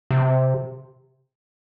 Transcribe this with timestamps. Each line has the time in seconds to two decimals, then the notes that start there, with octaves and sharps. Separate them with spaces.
0.11 C3